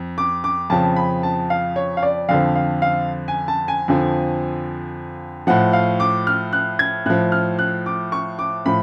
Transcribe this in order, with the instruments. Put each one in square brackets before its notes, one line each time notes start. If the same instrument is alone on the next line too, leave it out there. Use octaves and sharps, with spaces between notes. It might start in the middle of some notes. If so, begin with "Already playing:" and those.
Already playing: [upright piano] F2
D6
D6
F2 C#3 F3 A5
B5
A5
F5
C#5
F5
D5
F2 D3 F3 F5
F5
F5
G#5
A5
G#5
F2 D3 F3
A2 F3 F#5
F5
D6
F6
F#6
G#6
A2 F3 F#6
F6
F#6
D6
C#6
D6
A2 F3 B5